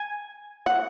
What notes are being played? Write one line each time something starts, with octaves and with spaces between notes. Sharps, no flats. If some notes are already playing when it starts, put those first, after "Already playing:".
Already playing: G#5
F#5